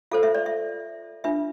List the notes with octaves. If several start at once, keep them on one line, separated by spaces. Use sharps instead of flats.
F4 A4 C5 F5
E5
D5
E5
D4 F4 B4 E5